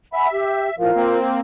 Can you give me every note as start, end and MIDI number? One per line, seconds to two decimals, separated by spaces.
0.13 0.76 76
0.13 0.26 78
0.13 0.26 80
0.13 0.26 83
0.32 0.68 67
0.78 0.91 45
0.78 0.91 53
0.78 1.17 65
0.78 1.17 70
0.78 1.17 77
0.95 1.40 58
0.95 1.40 60